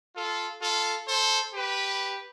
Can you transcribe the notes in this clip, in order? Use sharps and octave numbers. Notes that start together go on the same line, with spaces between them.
F4 A4
F4 A4
A4 C5
G4 B4